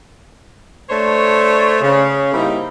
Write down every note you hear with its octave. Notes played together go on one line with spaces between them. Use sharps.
A3 D4 C5 C#5
C#3
G3 A#3 C4 D#4 E4